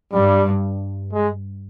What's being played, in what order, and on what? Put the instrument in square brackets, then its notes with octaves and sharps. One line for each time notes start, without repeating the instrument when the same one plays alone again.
[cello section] G2 [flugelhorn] G3
[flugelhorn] G#3